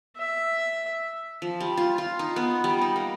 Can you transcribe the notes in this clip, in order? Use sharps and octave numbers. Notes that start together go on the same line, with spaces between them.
E5
F3
G3
F4
F4
D#4
B3
G3
D#4
A#3